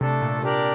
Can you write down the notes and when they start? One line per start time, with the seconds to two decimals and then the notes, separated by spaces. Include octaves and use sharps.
0.01 C3 A3 D4 A4
0.22 A#2
0.42 C3 D4 G4 A#4 D5